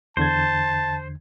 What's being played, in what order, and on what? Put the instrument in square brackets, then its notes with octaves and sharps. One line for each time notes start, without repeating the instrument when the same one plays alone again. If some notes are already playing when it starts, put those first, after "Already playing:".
[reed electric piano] E2 D3 G#6 [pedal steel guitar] C5 [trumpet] A5